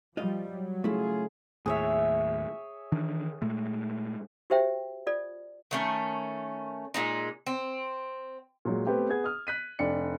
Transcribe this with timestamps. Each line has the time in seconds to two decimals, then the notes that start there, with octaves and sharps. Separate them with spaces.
0.17 F3 G3 F4 D#5
0.53 F#3
0.84 C#3 A3 E4 F4 G#4
1.66 D#2 A2 G#4 C#5 E5
2.92 D#3 E3 D4
3.42 A#2 G#3 A3
4.50 F#4 G4 C5 E5 G5
5.07 F4 A4 D5
5.71 D#3 A3 C#4
6.94 A#2 G#3 D#4
7.47 C4
8.65 A#2 F#3 G#3
8.87 A3 B3 C4 G4
9.09 B3 G#4 F#5 G#6
9.24 D#6 F6
9.47 F#6 B6 D#7
9.79 F1 D4 D5 G5 C#7